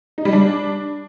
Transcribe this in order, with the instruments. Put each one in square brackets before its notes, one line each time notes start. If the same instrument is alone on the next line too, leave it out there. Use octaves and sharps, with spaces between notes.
[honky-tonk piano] D#4
G3
D4